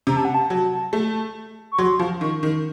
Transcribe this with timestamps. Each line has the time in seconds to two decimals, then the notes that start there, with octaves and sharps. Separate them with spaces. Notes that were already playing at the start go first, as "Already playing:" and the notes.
0.07 C3 A#5
0.17 A5
0.25 F#5
0.35 A5
0.50 F#3
0.93 A3
1.72 C#6
1.78 F#3 C6
1.99 F3
2.21 D#3 C#6
2.43 D#3